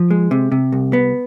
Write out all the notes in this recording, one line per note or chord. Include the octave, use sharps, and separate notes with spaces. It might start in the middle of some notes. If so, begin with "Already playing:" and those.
Already playing: F3
G#3
C3
C3
C2
B3